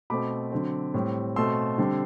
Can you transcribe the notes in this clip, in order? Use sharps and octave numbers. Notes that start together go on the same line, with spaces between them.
B2 A3 C4 B5 D6
D3 F#3 C4
A2 G3 C4
B2 A3 C4 C6 E6
D3 G3 C4